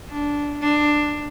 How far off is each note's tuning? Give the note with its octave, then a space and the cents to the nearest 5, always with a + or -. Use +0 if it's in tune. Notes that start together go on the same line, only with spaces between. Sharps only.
D4 -10
D4 +10